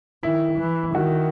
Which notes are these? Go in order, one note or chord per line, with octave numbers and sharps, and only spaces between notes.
D#3 E4
E3
D#3 F#4